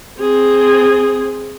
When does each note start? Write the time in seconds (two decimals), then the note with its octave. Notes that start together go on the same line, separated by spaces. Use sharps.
0.21 C4 G#4